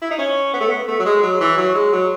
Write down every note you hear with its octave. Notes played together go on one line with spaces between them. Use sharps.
E4
D#4
C#4
B3
A3
B3
A3
F#3
G#3
F#3
E3
F#3
G#3
F#3